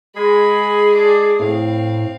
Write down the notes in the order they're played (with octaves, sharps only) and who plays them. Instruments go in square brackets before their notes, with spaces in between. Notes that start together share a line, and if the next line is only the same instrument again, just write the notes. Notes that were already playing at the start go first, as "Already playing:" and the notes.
[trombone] G#3 [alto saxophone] G#4 [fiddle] B5
[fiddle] A4 D5
[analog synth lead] A2 [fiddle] C4 F5